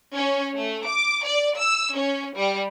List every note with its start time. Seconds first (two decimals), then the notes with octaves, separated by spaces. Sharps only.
0.14 C#4
0.56 A3
0.85 D6
1.24 D5
1.58 E6
1.96 C#4
2.36 G3